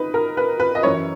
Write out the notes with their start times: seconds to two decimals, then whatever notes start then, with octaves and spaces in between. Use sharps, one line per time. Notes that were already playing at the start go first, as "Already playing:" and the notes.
Already playing: D#4 B4
0.14 A#4
0.37 B4
0.60 B4
0.75 D#5
0.83 F#2 E3 C#5